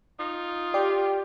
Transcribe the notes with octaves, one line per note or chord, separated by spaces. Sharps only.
D#4 F4
G4 D5 G5 D6